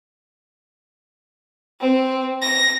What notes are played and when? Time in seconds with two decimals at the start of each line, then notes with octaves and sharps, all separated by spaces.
1.81 C4
2.42 A#6